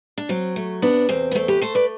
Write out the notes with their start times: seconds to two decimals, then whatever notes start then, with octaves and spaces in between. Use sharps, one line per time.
0.18 D4
0.29 F#3 C4
0.56 A3
0.82 C3 B3 D4
1.09 E2 C4
1.32 B3
1.35 A3 C4
1.48 G4 B4
1.61 A3 A4 C5
1.75 B4 D5